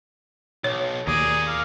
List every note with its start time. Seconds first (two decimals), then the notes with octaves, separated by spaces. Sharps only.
0.64 B1 C#5
1.07 D#2 G#4 A#4 D5
1.48 F5